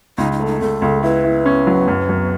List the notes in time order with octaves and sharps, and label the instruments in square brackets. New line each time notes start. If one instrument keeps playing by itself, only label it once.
[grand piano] C#2 [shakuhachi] D#4
[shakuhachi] D#4
[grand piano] A3
[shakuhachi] D#4
[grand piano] C#2 [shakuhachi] A4
[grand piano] C#2
[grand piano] E4 [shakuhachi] B4
[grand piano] E4
C#4
F#3
F#2
F#2